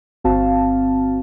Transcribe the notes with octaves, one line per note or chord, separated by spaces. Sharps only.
G1 C4 F#4 F5 A5